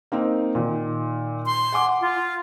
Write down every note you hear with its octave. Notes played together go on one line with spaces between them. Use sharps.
A#3 C4 D#4
A#2 D#3
C6
F#5 G#5 D6
F4